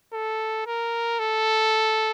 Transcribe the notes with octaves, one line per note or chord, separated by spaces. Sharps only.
A4
A#4
A4